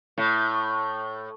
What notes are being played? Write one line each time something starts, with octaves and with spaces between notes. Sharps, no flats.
A2